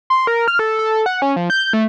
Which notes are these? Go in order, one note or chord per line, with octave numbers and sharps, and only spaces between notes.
C6
A#4
F6
A4
A4
F#5
C#4
F3
G6
A3